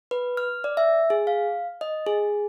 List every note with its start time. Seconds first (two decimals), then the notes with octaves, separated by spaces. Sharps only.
0.11 B4
0.37 F6
0.64 D5
0.77 E5
1.10 G#4
1.27 F5
1.81 D#5
2.07 G#4